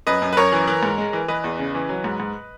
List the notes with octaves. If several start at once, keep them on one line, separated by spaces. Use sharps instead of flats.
F#2 B4 D#5
F#2
B4
F#2 A#4 C#5
E3
E3
G#2
G#3
E3
E3 B4 D#5
E2
C#3
E3
F#3
G#2
G#2